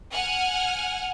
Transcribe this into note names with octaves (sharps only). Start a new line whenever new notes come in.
F#5 G#5 F6